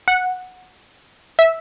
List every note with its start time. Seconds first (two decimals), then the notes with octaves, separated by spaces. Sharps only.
0.08 F#5
1.39 E5